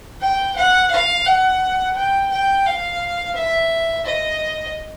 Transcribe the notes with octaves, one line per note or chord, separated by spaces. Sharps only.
G5
F#5
F5
F#5
G5
G5
F5
E5
D#5